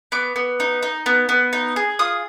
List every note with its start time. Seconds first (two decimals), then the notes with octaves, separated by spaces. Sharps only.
0.12 B3 D6
0.36 B3
0.60 D#4
0.83 D#4
1.06 B3
1.29 B3
1.53 D#4
1.76 G#4
1.99 F4 D#6